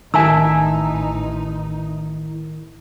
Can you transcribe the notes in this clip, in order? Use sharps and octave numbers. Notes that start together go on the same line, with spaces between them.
A1 D#3 D#4 E4 E5 G#5 A5 E6